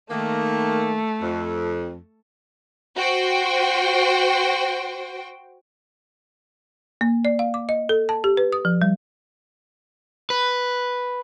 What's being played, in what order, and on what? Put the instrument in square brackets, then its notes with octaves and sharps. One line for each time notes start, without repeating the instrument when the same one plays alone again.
[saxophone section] D#3 A#3 [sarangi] A3
[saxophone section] F2
[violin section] F#4 C5 G5
[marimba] A#3
D5
F5
D6
D#5
A4
A5
G4
B4
D#6
F3
G3
[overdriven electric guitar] B4